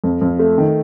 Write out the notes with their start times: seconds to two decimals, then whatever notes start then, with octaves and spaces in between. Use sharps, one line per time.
0.04 F2
0.21 F2
0.39 A3
0.58 D#3